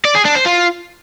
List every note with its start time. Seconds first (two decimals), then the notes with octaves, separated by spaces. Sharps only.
0.05 D5
0.15 G#4
0.25 D4
0.35 C5
0.45 F4